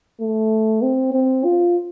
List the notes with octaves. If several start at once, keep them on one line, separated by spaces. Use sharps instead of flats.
A3
C4
C4
F4